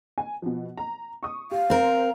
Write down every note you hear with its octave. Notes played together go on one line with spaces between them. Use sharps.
G#5
B2 F3
A#5
C#6 D#6
G4 F5
C4 A#4 C5 A#5